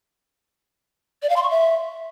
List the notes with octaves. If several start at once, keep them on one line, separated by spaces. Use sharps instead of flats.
D5
F5
C6
C#6
E5